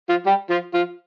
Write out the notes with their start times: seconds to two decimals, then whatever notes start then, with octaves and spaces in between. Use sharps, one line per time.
0.09 F3 F4
0.26 G3 G4
0.50 F3 F4
0.74 F3 F4